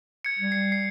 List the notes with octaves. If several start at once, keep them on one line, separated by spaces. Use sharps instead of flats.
G#6 C#7
G3
C7
C7